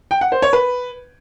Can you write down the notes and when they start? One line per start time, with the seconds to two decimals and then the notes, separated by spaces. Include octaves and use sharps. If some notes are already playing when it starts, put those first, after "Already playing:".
0.11 G5
0.21 F#5
0.32 C5
0.42 C#5
0.53 B4